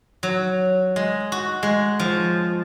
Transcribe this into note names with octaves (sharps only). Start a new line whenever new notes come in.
F#3
G#3
F#4
G#3
F3